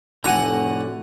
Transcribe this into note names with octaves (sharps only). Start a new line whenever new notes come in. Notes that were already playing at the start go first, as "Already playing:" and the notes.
F1 A2 D3 F#4 F#5 G#5 A#5